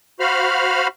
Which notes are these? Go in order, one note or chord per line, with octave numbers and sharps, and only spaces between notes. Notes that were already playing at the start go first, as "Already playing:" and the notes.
F#4 C5 F5 B5 F6